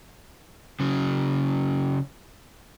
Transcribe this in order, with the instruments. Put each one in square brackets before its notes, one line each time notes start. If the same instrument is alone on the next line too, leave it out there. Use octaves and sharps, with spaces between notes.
[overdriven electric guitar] C#3 F#3